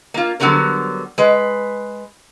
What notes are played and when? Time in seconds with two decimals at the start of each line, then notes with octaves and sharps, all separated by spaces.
0.14 A#3 F4
0.40 D3 F#3 G3 B3 C#4 A#4
1.18 G#3 B4